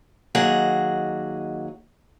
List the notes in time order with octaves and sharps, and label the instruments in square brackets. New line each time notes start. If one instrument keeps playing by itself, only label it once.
[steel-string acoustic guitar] D#2 F#3 G#4 D#5 F#5 A#5